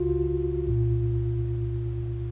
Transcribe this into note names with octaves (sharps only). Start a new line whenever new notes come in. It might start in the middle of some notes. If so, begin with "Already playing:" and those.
Already playing: C#2 C#3 F4 F#4
C2 A#2